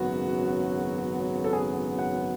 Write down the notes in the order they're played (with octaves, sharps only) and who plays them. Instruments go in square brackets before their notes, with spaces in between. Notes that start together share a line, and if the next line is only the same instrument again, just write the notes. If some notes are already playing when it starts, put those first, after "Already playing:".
Already playing: [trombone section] G#1 F#2 C#3 F#3 B3 [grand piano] F#4
[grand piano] A4
G#4
F#5